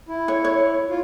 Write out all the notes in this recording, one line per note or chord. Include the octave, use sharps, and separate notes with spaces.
E4
C#5
C#5
F4